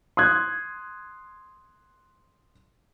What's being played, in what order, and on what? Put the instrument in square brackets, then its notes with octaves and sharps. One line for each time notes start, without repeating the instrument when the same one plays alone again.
[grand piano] C6 D#6 F#6 G#6